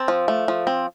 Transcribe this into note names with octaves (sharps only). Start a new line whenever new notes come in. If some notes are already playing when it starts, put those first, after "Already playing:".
Already playing: C4 A5
F3
A3
F3
C4